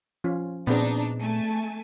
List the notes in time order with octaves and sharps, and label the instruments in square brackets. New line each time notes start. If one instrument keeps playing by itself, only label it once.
[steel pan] F3 C#4 F4
[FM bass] A#2 [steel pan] B3 C4 G#4 [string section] D4 D#4
[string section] A3 G#5 A5